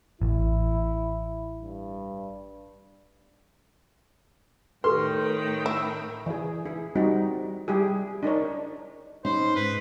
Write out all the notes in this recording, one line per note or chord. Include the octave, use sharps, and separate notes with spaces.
A1 E4
G2
A2 D#3 G4 A4 B4 G5 C6
E4
E3 G#4
E4 G#4
G3 C4 D#4 F#4
G3 E4 G4 G#4
D4 D#4 A#4 C#5
C#4 D#4 B4 C5
G#2 B4